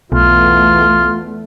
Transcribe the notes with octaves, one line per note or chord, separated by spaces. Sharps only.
B1 E2 A3 B3 F4